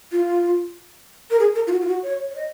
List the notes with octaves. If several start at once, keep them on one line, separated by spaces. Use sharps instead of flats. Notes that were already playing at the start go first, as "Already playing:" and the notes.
F4
A#4
G#4
A#4
F4
F#4
F4
F#4
C#5
C#5
D#5